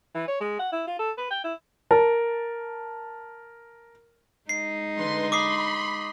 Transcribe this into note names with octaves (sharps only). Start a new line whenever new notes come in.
E3
C#5
G#3
F#5
E4
F4
A4
B4
G5
E4
A#4 A5
G#3 D#4 C7
D3 B4 C6
B5 C6 D6 D#6 C7